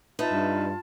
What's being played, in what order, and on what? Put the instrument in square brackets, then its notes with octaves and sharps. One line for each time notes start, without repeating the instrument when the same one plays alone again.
[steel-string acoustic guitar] D#4 B4 E5 [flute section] F4 A5
[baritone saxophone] G2